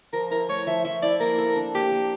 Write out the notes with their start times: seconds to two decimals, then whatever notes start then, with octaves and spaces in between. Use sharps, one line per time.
0.13 F3 A#4
0.31 E4 A#4
0.49 A3 C#5
0.67 F3 E5
0.84 F3 E5
1.02 E4 D5
1.20 A#3 A#4
1.38 A4
1.56 D4
1.75 A#3 G4
1.92 A#3